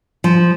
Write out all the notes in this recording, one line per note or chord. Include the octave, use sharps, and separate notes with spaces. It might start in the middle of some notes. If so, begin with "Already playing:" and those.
F3